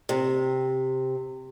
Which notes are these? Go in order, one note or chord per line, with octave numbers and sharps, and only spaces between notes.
C3